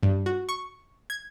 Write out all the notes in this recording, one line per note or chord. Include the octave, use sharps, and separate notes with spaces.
G2
F#4
C#6
G#6